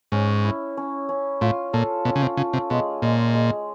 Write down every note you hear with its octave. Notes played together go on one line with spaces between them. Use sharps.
G#2 C#4
E4
C#4
C#4
A2 F4
A#2 A4
B2 C#4
C#3
C3
C#3 F4
C3
B2 G#3
A#2 G#3
G#3